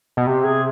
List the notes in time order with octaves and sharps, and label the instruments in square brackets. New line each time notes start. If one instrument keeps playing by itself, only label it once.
[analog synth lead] B2
[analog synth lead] C3 [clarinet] G4
[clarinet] G#4